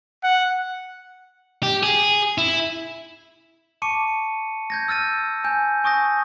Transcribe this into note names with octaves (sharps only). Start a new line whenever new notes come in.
F#5
G4
G#4
E4
A5 C#6 D6 C#7 D#7
G6 G#6 A#6
E6 F6 A6 D#7
G#5 G6
G#5 C#6 D#6 G6 A#6